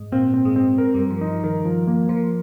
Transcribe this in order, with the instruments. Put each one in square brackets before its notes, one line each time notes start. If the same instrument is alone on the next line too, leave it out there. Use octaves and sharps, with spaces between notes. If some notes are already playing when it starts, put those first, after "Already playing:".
Already playing: [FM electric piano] G#2 G#3
[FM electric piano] A#2 A#3 [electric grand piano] C4
[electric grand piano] C4
[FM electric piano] G#2 G#3
[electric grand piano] C4
A#4
[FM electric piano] G2 G3 [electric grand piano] A#4
[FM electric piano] F3
[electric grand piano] D#4
[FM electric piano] F3
[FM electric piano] D#3 [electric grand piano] A#4
[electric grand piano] F3
A#3
[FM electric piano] F3 [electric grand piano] A#4